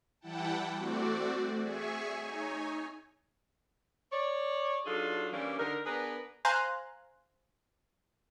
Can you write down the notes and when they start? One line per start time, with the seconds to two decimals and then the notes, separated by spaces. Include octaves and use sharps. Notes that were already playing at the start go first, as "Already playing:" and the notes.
0.21 E3 G3 E4 F#5 G5 A5
0.74 A3 C4 F#4 D5
1.61 G#4 E5 G#5 C#6
2.17 D#4 C#5 G#5
4.12 C#5 D5
4.85 F#3 D4 D#4 F4 G#4 A4
5.33 E3 G3 A#3 C#4 D4
5.58 D3 D4 D#4 A#4
5.85 B3 D4 G#4 A#4 B4
6.45 C5 F5 G#5 A#5 C6 F#6